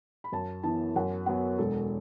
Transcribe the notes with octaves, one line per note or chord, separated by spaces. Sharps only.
B5
F#2 A5
E3 B3 A5
F#2 F#5
F#3 B3 F#5
E1 A4